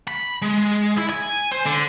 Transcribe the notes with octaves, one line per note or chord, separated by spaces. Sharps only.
B5
G#3
E4
G#5
C5
D3